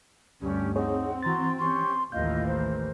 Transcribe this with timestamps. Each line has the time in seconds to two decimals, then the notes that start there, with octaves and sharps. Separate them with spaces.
0.41 D2 G2 C#4 G4
0.76 C4 D#4 G#4 C#5 F#5
1.23 E3 F#4 A#5 C6 A6
1.58 C#4 G4 C6 C#6
2.12 A1 D#2 E3 F4 A#4 D#5 F5 G6
2.46 A#4 C5